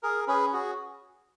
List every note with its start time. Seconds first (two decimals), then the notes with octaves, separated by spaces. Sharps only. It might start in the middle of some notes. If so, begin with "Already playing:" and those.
0.03 G#4 A#4
0.28 C#4 G#4 B4
0.53 F#4 G#4